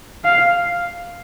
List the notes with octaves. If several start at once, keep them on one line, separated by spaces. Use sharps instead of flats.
F5